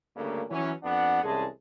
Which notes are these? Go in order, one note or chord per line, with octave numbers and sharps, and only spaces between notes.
D2 G2 C#3 A3 A#3
E3 F#3 C#4
F2 B3 D4 F#5
C2 E3 G#3 C#4 G#4 A5